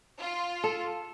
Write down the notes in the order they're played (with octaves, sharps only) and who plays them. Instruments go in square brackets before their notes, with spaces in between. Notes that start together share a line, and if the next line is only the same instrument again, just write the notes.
[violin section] F4
[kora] A4